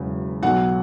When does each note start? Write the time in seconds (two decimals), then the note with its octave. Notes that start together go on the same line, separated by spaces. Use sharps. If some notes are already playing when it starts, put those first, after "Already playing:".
Already playing: E1 E2 C#3 F#3
0.43 B1 B2 F#3 F#5